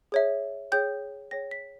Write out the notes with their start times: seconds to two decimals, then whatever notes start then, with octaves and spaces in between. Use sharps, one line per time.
0.12 G#4 C#5 E5
0.72 G#4 C#5 G5 G6
1.31 G#4 C#5 G5 A#6
1.51 B6